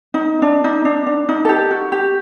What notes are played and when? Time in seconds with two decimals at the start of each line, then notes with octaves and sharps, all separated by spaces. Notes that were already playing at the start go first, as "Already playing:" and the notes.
0.14 D#4
0.42 D4
0.64 D#4
0.85 D4
1.06 D4
1.29 D#4
1.45 A4
1.49 G4
1.71 F#4
1.92 G4